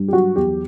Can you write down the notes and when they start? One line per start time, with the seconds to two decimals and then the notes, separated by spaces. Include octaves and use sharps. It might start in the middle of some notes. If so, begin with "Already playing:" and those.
Already playing: G2
0.08 G4
0.12 F#3 F#4
0.36 E2 G4